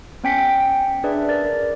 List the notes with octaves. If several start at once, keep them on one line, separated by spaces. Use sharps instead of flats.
B3 C#4 G5 G#5 B6 C#7
D4 G#4 B4 D5 E5
A#4 D5 A6